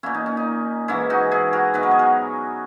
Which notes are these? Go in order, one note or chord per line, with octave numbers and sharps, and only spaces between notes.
A#2 A#3 C#4 E4
D#4
C#4
D#4
G#2 E3 A#3 C#4 E4
D#4 F#4
E4 G#4
F#4 A#4
G#2 F#3 B3 B4
A#4
G#4
F#4 A#4